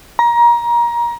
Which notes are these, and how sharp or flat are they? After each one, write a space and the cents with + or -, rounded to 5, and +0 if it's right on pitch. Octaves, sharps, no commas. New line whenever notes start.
A#5 +25